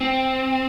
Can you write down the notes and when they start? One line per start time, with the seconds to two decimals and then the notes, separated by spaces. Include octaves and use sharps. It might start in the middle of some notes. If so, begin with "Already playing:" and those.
0.01 C4